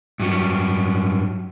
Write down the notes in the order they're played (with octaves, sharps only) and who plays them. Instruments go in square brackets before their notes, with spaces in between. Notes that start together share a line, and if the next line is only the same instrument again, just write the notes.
[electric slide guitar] G2 F#3